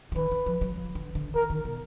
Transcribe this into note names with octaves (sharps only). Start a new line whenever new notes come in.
F3
D#3 B4
D3
F3
F#3
F3
D3
D3
D#3 A#4
D#3
B2